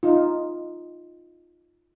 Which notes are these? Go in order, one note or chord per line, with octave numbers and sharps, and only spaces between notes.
D#4 F4